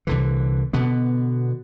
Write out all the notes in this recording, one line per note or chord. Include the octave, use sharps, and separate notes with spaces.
C2 D3 E3
B2 D3 B3